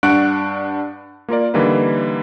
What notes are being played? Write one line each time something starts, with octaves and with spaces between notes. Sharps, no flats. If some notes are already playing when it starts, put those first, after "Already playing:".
G2 D4 F#5 C#6 F#6 D7
A#3 F4 A#4 D5
D3 E3 G3 A#3 D#4 B4